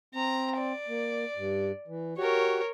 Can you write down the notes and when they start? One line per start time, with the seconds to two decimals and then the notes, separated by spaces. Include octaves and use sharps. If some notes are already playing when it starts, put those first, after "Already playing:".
0.15 C4 A#5
0.58 D5
0.88 A#3
1.36 G2
1.88 E3
2.18 F#4 G4 A#4 C#5